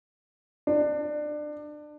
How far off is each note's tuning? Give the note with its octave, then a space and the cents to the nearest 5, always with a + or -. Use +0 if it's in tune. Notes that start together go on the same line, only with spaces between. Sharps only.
D4 +25